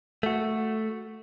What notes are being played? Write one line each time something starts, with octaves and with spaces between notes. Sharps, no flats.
A3 F#4